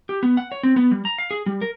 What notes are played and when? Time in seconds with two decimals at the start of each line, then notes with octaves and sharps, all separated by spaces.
0.09 G4
0.23 B3
0.37 F#5
0.52 C#5
0.63 C4
0.76 B3
0.91 G3
1.05 A#5
1.18 F5
1.31 G#4
1.46 G3
1.61 A#4